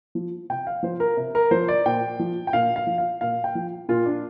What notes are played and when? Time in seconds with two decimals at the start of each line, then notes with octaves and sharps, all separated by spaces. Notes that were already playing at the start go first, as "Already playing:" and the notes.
0.15 F3
0.50 C3 G5
0.67 F5
0.83 F3 C5
1.00 A#4
1.17 C3
1.35 A#4
1.51 F3 C5
1.68 D5
1.86 A#2 G5
2.19 F3
2.47 G5
2.53 A#2 F5
2.76 F5
2.87 F3
2.98 F5
3.21 A#2 F5
3.44 G5
3.55 F3
3.89 A#2 F4
4.06 D4